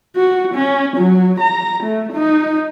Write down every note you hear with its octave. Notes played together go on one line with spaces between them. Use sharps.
F#4
C#4
F#3
A#5
A3
D#4